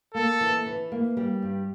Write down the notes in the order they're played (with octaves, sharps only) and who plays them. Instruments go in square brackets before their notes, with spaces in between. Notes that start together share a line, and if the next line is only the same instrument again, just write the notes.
[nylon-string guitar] A#3 [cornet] A4
[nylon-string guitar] E3
E3
A#3
G3
G2